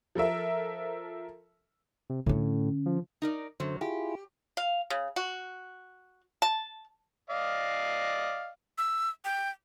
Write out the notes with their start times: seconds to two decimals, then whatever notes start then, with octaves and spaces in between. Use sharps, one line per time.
0.15 F3 A4 A#4 E5
2.10 C3
2.26 A2 D3 C#4
2.86 F3
3.22 D#4 A#4 D5
3.60 F#2 D3 F#3 C5
3.81 E4 F4 G4 G#4
4.57 F5
4.90 C#3
5.16 F#4
6.42 A5
7.30 D5 D#5 F5
8.78 E6
9.25 G5